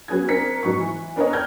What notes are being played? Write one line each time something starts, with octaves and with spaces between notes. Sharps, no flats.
F#3 B3 C#4 G#4 G#6
C4 D4 A#4 B6 C#7
G#2 F#3 B3 C#6
E3
B3 D4 A#4 B4 C#5 D#5
D5 G5 F6 G6 G#6